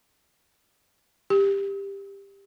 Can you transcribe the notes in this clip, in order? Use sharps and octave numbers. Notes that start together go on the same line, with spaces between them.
G4